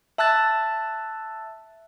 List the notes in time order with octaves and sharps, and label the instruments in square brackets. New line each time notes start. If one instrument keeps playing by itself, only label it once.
[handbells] E5 A5 E6 F#6 A6